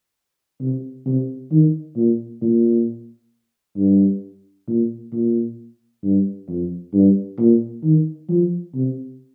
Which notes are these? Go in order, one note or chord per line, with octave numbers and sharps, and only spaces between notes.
C3
C3
D#3
A#2
A#2
G2
A#2
A#2
G2
F2
G2
A#2
D#3
F3
C3